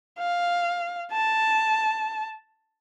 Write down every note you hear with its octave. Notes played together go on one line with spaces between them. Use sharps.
F5
A5